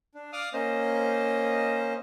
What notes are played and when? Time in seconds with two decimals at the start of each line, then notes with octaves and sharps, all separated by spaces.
0.15 D4
0.33 D5 F5 D6 D#6 F6
0.53 A#3 C#4 C5 D#5